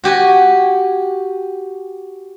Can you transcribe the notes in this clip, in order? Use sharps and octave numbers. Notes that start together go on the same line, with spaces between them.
F#4 G4 G#5